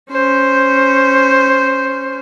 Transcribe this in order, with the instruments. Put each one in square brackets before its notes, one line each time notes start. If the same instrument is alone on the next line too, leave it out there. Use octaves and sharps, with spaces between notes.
[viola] C#4 C5